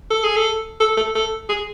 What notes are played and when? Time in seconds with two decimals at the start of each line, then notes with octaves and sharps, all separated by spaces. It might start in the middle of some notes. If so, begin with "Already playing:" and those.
0.11 A4
0.24 G#4
0.36 A4
0.80 A4
0.97 A4
1.15 A4
1.49 G#4